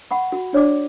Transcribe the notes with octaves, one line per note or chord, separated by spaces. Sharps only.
F#5 B5 C#6
F#4
D4 C#5 D5 D6